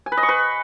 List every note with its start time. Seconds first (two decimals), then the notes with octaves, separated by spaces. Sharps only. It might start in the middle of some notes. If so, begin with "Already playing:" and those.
0.06 G#5
0.12 B4
0.17 D#5
0.23 C#6
0.29 B4